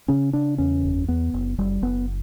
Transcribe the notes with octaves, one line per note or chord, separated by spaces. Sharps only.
C#3 C#4
C#3 D4
E2 C#4
F#1
E2 B3
F#1
F#1 G3
F#1 B3